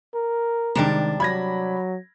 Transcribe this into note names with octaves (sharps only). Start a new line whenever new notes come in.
A#4
C3 D#3 G3 G#3 D4
F#3 B5 G#6 A#6